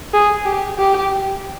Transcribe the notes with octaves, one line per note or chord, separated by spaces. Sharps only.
G#4
G4
G4